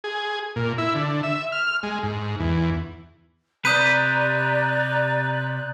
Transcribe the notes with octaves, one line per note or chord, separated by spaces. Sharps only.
G#4
A#2
E4
D3
E5
F6
G#3
G#2
E2
C3 B4 D5 A#5 D#6 F#6 G6 D#7